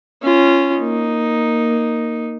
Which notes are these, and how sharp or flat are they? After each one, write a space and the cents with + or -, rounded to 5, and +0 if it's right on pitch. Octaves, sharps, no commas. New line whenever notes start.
C#4 -5 F4 -25
A#3 +0 D#4 +0